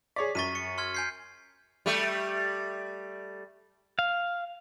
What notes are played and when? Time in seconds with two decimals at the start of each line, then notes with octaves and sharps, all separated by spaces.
0.16 G#4 C#5 D5 B6
0.35 F#2 C#6 A6 B6 D#7 G7
0.55 C#7
0.78 C6 F6 G#6
0.94 G#5 G6 C7
1.86 G3 A3
3.99 F5